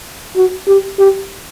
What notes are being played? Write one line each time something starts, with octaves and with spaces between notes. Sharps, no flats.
F#4
G4
G4